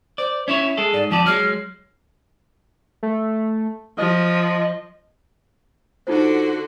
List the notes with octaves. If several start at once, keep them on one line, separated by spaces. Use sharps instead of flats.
C5 D5
C#4 E4 C#5 E5
G#3 G#4 A4
G#2 D5
F2 F3 D5 A5
F#3 G#3 F6
A3
F3 D#5
D3 D#4 F4 F#4 C5